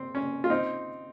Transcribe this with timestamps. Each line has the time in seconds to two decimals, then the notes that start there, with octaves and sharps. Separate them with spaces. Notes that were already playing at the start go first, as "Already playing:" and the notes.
Already playing: C4
0.15 C#4
0.44 F4
0.50 C4 D#4